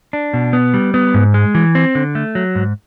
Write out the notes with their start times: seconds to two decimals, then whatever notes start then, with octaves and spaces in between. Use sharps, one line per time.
0.13 D4
0.34 B2
0.53 B3
0.74 G3
0.94 B3
1.14 G#2
1.34 G#3
1.55 E3
1.75 C4
1.95 D3
2.15 A3
2.35 F#3
2.55 G#2